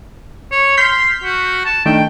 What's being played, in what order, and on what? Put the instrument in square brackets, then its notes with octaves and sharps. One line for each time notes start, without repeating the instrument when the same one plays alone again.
[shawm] C#5
[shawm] C6 [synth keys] F6 G6 B6
[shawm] F#4
A5
[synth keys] D#3 A3 D4 [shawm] G5